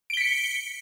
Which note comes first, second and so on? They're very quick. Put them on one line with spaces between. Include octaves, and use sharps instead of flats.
D7 G7 B6 C#7